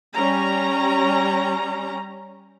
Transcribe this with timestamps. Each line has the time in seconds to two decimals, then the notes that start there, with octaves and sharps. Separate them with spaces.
0.13 G3 C#4 A#5